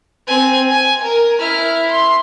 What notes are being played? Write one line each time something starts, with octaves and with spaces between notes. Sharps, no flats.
C4 G#5
G#5
A#4
E4 F6
C6